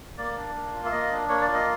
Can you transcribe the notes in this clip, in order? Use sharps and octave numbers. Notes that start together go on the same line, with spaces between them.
A#3 D5
D4
A#3
F4
E5
A#3 D#5
D4
A#3 C#5
D5
F4
D#5